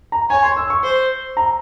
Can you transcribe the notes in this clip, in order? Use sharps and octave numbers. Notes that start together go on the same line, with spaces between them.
A#5
C#5 G#5
C6
E6
C#6
C5
A#5